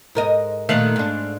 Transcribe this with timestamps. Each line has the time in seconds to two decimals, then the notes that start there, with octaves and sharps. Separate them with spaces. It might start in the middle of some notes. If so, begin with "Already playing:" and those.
0.15 G#2 A#4 D#5
0.69 G2 A#2 D#3 A3 F5 F#6
0.96 G#2 D4